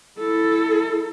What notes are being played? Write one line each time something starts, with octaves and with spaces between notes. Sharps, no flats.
E4 A4